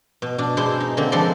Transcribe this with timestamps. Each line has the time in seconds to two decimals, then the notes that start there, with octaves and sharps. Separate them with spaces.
0.22 B2
0.38 B2 D4
0.57 B2 G#3 D4 E4 C5 C6
0.80 D#4
0.97 D3 D#3 A#3 C4
1.12 F3 G#3 A4 B4 D5 C6